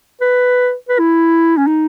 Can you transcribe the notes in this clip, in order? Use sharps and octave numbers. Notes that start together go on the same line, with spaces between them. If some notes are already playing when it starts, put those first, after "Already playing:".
B4
B4
E4
C#4
D#4